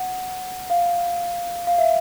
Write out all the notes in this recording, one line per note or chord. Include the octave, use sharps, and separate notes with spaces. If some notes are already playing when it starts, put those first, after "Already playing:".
Already playing: F#5
F5
F5
E5